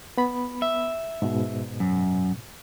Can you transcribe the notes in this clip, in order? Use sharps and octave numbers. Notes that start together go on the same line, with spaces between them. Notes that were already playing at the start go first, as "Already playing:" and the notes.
B3 B5
E5
G#2 B2
F#2